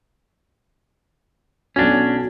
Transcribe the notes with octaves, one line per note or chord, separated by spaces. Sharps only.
B1 C#4 D4 F#4